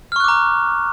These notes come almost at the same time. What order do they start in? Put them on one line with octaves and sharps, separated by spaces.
F6 C#6 F#6 D6 A#5